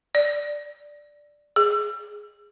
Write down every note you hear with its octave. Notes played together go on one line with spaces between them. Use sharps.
D5
G#4